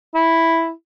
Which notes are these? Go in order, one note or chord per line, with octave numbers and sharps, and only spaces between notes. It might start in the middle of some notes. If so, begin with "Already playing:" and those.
E4